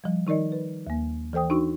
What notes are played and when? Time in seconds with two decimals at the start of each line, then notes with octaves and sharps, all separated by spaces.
0.04 F3 G3
0.27 D#3 D#4 A#4 D5 D#5
0.52 B4
0.87 D#2 A#3
1.33 E3 A4 C5 G5 D#6
1.50 D4 D#4 F#4 C#6